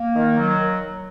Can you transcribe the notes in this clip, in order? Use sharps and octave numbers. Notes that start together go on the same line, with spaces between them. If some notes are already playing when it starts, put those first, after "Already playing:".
Already playing: A#3
D#3
F#3